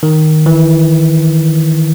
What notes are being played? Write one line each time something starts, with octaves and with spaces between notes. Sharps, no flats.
D#3
E3